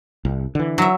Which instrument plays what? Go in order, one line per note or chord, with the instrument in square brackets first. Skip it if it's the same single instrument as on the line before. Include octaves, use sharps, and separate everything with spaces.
[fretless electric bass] C2
D3 E3
[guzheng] F#3 E5